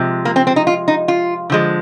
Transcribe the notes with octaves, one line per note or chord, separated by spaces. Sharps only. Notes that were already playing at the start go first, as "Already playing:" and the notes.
Already playing: C3 F3 G#3
A#3
C4
C4
D#4
F4
D#4
F4
D3 F3 G#3